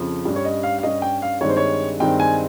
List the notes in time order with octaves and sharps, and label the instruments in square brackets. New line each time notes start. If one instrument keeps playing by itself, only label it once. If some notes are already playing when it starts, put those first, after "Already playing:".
Already playing: [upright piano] F2 C#3 F3
G2 G3 C#4
C#5
D#5
F5
F5
G2 G3 C#4 D#5
G5
F5
G2 D#3 G#3 C4 D#4 C#5
C5
C#5
G2 D#3 G#3 C4 D#4 G5
G#5